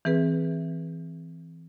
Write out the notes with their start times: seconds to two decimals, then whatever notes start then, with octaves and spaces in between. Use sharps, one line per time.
0.05 E3 C4 G#4 B4